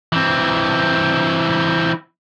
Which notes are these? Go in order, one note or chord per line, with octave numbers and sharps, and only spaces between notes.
E3 C4